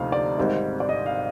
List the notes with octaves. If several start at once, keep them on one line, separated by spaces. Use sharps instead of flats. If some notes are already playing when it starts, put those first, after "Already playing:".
Already playing: D2 C3 F3 A#3 D#4 F5
D5
G#1 G#2 G3 C4
D5
D#5
F5